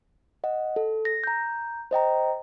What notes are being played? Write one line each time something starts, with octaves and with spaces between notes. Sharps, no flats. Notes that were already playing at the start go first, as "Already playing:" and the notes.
D#5 F#5
A4
A#6
A#5 G6
C5 D#5 G5 A#5